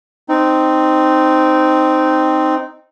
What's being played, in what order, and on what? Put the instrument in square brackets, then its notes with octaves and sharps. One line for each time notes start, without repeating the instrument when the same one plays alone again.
[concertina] C4 D#4